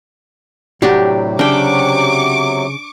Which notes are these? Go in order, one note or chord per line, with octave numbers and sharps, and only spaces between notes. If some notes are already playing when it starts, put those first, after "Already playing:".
A2 C3 F#3 D4 F#4 G4
C#3 D4 G5 C#6 D6